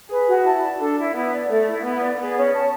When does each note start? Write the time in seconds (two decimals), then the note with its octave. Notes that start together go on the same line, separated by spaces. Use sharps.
0.09 G#4 B4
0.26 F#4
0.44 E4 A5
0.61 D5
0.79 D4 A4
0.97 E4
1.14 B3 E4
1.31 D5
1.49 A3 A4
1.66 E4
1.83 B3 E4
2.01 D5
2.18 B3 G#4
2.35 C#4
2.53 A5